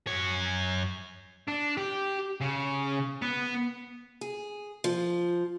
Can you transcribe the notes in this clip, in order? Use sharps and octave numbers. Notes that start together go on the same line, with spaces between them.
F#2 C#5
D4
G4
C#3
B3
G#4
F3